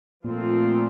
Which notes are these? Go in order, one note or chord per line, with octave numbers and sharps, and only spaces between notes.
A#2 F3 A3 C4 F4